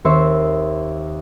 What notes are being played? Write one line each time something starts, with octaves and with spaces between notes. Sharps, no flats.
D#2 C4 C5 E5 C#6